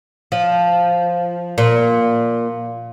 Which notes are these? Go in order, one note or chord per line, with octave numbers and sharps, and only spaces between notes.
F3
A#2